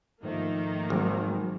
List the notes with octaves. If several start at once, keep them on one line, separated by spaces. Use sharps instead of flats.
G#2 D#3 F3 A3 A#3
G#1 F#3